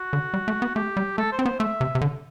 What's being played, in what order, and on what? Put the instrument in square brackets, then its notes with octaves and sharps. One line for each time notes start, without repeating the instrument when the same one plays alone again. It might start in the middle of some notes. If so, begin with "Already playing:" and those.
Already playing: [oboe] F#4
[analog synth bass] D3
G3
A3
B3
[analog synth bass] A3 [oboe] G4
[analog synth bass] G3
[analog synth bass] A3 [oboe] A4
[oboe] C5
[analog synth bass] C4
[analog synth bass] B3 [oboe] C5
[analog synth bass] A3 [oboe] E5
[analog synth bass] C3
C3
D3